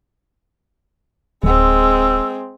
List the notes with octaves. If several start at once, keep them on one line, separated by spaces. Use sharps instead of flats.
D1 G#3 C4 E6